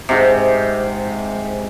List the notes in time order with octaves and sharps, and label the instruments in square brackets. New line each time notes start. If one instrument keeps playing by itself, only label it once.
[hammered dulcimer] G#2 C3